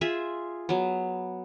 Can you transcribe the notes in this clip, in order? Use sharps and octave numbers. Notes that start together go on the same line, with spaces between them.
F4 G#4 E5
F#3 B3